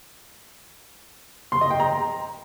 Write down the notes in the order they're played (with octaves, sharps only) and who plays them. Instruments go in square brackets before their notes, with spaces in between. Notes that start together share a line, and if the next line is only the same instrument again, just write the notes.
[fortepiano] C6
D#5
G5
A#5